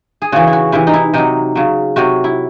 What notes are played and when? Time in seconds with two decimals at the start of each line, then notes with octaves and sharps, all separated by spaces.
0.22 G#4
0.32 C#3 E3 F#4
0.47 E4
0.53 F#4
0.72 C3 E3 E4
0.87 D#4
0.93 E4
1.14 C3 F#3 D#4
1.55 C#3 F#3
1.96 C3 F#3 F#4
2.24 E4